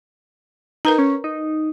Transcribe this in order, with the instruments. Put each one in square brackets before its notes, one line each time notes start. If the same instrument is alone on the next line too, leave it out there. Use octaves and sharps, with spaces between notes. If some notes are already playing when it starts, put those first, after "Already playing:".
[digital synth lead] D#4 [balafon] A#4 B4 A#5
[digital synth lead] C#4
D#4